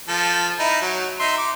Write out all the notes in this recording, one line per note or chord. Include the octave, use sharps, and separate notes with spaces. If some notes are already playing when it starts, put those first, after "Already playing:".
F3 A4
D#4 E4
F#3
D#4 E5 C6
D6